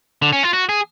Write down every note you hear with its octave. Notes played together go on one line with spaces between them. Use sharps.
D3
C#4
F4
F#4
G#4